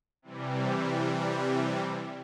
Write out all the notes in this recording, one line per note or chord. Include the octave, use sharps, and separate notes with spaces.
C3 E3 G3